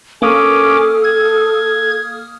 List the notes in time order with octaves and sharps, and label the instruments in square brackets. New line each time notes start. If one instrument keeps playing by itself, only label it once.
[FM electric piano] A#3 D#6 F6 [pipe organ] C#4 D6 [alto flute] A4
[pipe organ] G#6